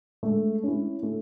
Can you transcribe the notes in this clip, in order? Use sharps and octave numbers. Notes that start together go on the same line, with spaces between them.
G#3 A3
C#4 E4
A3